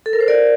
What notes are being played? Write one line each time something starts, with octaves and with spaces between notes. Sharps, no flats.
A4
A#4
C5
A#4 D5